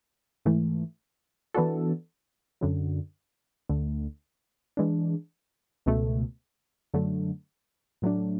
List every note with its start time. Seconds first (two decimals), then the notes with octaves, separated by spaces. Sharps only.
0.45 G#2 E3 A3
1.54 E3 B3 D4 F#4 A4
2.61 F#2 D3 F#3
3.69 D2 D3 A3
4.77 E3 G#3 D4
5.86 C#2 B2 A3
6.94 F#2 D3 F#3 A3
8.02 A2 F#3 A3 D4